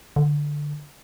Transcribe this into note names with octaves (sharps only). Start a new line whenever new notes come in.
D3